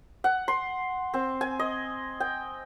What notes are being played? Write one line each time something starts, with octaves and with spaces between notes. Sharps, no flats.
F#5
C6
C4
G#5
D#5
G5